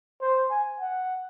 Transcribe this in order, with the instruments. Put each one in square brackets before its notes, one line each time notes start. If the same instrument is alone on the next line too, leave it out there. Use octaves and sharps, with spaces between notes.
[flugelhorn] C5
G#5
F#5